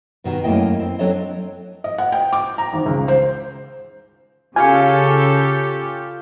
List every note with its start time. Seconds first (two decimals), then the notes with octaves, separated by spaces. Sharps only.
0.24 G2 B2 D#3
0.43 F#2 A3 A#3 E4 D#5 G5
0.80 C4
0.99 F#3 C4 D4 A4 C#5 D#5
1.84 D#5
1.98 F#5
2.12 G5
2.33 D6
2.58 A#5
2.73 G#1
2.86 C#2
3.08 C5
4.56 C#3 F4 G4 A4 C#5 F5 G#5 C#6